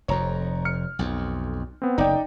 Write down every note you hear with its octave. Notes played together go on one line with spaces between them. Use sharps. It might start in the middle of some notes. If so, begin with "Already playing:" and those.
F1 F2 C#5 A#5
F6 C#7
B1 F2
B3 C4
F#1 D#4 D5 G5